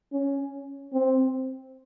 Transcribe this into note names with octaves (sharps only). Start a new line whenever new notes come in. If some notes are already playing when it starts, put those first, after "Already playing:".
C#4
C4